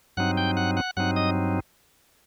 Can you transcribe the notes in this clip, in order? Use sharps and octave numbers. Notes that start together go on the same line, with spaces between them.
G2 F#3 C4 D#4 F#5 F#6
G5 G6
F#5 F#6
F#5 F#6
G2 F#3 C4 D#4 F#5 F#6
D#5 D#6